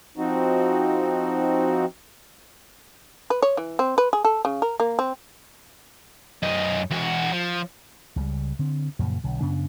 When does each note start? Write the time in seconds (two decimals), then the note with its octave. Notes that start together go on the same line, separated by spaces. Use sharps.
0.17 F3 C4 D#4 F#4
3.30 B4
3.43 C#5
3.57 E3
3.79 C4
3.98 B4
4.13 G#4
4.25 A4
4.45 C#3
4.62 A#4
4.80 A#3
4.99 C4
6.43 F#2 D#4
6.91 E2 F#4
7.32 F3
8.16 C#2 C#3 E3 G3
8.59 D3 C4
8.99 F#2 A#2 C#3 F3
9.24 B1 D3
9.41 F#2 C#3 B3 D4